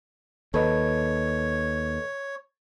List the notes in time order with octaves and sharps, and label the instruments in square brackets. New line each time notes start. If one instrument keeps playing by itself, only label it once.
[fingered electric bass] D#2 [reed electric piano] A4 B4 D#5 [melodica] C#5